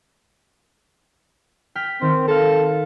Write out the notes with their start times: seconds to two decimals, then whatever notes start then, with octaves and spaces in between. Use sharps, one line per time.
1.75 G5 F6 B6
2.02 D#3 C4
2.28 A4 F5 A#6